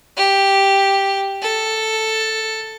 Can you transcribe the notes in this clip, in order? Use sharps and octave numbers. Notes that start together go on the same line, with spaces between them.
G4
A4